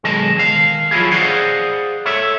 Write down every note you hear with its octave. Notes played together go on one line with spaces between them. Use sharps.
B1 D#3 G#3 D#5 A5
D#3 F5
F3 F#3 C4 E4 F4 G#4
G#4 C5 D5 D#5 F5 F#5
A4 C#5 E5